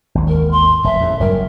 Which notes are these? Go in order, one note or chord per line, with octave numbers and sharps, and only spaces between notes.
G#1 D#2
A#4
C6
F1 E5
E2 A2
F#1 G2 F#3 A#4